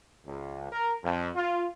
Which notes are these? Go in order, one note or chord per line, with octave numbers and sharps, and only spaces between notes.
C#2
A#4
F2
F4